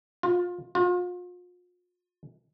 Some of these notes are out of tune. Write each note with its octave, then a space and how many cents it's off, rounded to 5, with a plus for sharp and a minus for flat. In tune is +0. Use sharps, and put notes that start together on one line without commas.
F4 +25
F4 +40